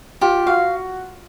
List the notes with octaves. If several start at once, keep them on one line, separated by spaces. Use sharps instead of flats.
F4 G4
F#4 F5